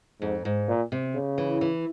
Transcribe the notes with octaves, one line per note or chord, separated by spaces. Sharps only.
F2 G#2
G#2
A#2
C3
C#3
E3
E3